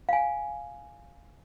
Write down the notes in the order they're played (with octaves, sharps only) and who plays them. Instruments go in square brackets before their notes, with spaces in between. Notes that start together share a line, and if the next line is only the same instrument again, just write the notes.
[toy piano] F5 G#5